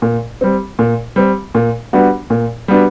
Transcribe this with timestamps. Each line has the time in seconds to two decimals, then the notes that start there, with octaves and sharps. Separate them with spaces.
0.02 A#2
0.41 G3 C4
0.79 A#2
1.16 G3 C4
1.55 A#2
1.93 G3 B3 D4 F#4
2.30 A#2
2.68 G3 B3 D4 F#4